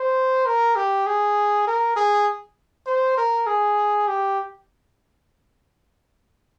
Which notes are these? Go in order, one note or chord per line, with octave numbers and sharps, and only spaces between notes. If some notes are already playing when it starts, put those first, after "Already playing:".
Already playing: C5
A#4
G4
G#4
A#4
G#4
C5
A#4
G#4
G4